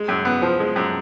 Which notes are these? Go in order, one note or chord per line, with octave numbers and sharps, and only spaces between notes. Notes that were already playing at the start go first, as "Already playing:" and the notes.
Already playing: G#3
F#2
B3
F3
G#3
F#2